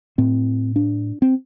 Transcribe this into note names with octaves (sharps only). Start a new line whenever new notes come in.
A2 C4
D4
C4